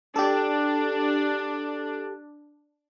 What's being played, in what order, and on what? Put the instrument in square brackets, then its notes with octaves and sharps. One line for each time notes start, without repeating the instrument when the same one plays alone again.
[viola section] D4 [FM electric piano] G4 A4